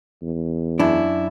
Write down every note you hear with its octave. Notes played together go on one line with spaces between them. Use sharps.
E2
F#2 D4 E4